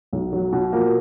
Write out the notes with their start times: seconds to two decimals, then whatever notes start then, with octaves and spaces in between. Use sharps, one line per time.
0.13 B1
0.33 F#3
0.53 B2
0.73 F3 A#3